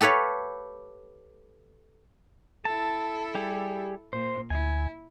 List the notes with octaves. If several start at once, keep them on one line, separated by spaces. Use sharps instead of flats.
G4 A4 B4 C#5 F5
E4 A4 A5
G3 G4 G#4
A#2 C5
D2 E4 G#5